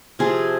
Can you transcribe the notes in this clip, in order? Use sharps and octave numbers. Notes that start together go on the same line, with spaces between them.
C3 F3 C4 G#4